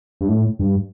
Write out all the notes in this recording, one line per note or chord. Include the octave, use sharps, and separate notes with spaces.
G2
A2
G2